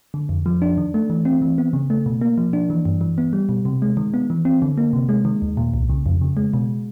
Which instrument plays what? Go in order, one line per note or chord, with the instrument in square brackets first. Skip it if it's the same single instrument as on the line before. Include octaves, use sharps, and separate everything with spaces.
[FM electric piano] D3
F2
F3
D4
D#3
A3
E3
C4
E3
B3
C#3
A3
B2
A#3
F3
D4
E3
G2
E3
B3
G3
B2
C3
G#3
D#3
B3
E3
C4
D3
A#3
C3
G#3
D#3
D#2
A#2
C2
C#3
F2
C#3
G#3
B2